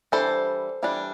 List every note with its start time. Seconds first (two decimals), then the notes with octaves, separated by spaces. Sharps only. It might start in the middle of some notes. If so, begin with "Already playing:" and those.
0.12 E3 G3 D4 A4 C5
0.83 E3 G3 D4